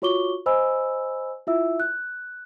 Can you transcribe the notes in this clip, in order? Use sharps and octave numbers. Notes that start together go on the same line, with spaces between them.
F4 F#4 C#5 C#6 D6 G7
C5 D#5 G#5 B5 E6
E4 F4 E5 E6
F#6